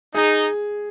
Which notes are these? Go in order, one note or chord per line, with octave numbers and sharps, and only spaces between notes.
D#4 G#4